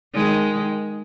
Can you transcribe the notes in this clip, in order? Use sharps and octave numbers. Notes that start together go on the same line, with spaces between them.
D#3 G#3